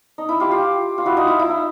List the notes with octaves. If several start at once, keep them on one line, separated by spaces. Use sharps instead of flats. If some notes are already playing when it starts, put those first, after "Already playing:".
D#4
E4
F4 G4
F4 G4
F4
E4 F#4
D#4 F4
E4
E4
D#4